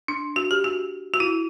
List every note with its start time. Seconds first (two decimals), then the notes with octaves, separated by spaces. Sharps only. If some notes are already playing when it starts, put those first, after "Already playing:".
0.08 D4
0.36 F#4
0.51 G4
0.64 F#4
1.14 F#4
1.20 E4